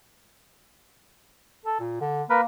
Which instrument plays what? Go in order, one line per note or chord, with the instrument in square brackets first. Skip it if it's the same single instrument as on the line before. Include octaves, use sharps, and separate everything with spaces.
[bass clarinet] A4
A#2
D3
[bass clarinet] A#3 [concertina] A#4 B4